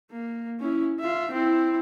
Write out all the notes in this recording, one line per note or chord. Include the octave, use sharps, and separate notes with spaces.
A#3
C#4 E4
F4 E5
C4 E4